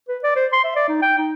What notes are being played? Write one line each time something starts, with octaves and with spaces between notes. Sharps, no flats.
B4
D5
C5
C6
E5
D5
D#4
G5
D#4